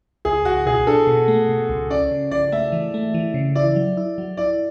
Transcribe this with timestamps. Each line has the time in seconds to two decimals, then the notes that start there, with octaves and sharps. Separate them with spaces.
0.25 C#2 G#4
0.45 C#2 F#4
0.66 B2 G#4
0.87 D4 A4
1.07 B2
1.28 A3
1.49 B2
1.69 C#2
1.90 C#4 D5
2.11 C#3
2.31 C#3 D5
2.52 A3 E5
2.72 E3
2.94 A3
3.14 E3
3.34 C#3
3.55 E4 D5
3.76 F#3
3.97 E4
4.18 F#3
4.37 E4 D5